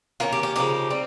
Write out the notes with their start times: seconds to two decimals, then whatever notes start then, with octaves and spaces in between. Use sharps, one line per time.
0.20 D#3 A#3 C#4 F4
0.33 G4
0.43 G4
0.56 C#3 F3 A#3 D#4 G4
0.90 G3 C4